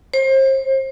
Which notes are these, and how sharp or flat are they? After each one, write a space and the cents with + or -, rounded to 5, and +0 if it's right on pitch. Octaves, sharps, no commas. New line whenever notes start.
C5 +35